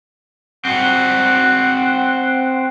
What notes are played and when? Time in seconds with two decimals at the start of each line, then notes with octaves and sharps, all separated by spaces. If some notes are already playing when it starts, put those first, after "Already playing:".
0.65 C4 F#4 F#5